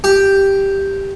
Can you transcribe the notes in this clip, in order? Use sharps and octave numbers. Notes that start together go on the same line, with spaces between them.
G4